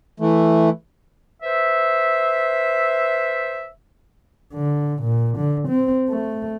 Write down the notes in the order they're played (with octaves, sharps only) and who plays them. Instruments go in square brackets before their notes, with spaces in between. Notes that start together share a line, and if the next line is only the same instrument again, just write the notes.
[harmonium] E3 A3
[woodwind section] B4 C5 E5
[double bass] D3
A#2
D3
C4
A3